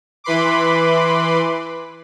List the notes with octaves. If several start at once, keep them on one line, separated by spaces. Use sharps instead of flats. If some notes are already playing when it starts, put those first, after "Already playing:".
E3 B4 B5 C6 D6